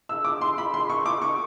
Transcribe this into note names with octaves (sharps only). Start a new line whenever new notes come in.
E6
D6
C6
B5
C6
C#6
D6
C#6